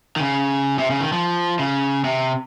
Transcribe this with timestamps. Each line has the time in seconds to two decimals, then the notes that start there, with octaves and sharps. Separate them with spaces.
0.16 D#3
0.20 C#3
0.79 C3
0.90 C#3
1.01 D#3
1.13 F3
1.59 C#3
2.04 C3